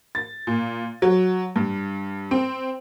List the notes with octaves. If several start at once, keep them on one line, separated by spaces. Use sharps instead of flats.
A6
A#2
F#3
G2
C4